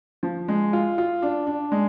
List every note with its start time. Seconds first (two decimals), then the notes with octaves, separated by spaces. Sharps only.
0.23 F3
0.48 G#3
0.73 F4
0.98 F4
1.22 D4
1.47 D4
1.72 G#3